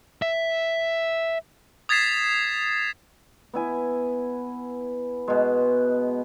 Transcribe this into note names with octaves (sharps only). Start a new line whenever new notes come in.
E5
D#6 G#6 A6 B6 C7 E7
B3 E4 G#5
B2 G#3